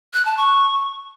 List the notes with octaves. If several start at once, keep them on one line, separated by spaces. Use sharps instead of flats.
F#6
A5
C#6